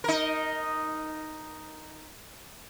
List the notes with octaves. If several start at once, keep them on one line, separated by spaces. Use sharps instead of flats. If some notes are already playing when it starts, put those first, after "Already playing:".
D#4 A#4